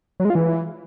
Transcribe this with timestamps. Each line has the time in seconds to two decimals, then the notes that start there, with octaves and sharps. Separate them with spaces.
0.20 F#3
0.25 G#3
0.30 F4
0.35 E3